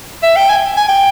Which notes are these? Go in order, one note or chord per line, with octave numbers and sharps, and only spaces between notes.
E5
G5
G#5
G#5
G5